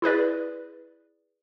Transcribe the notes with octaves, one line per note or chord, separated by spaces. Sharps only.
E4 G#4 B4 D5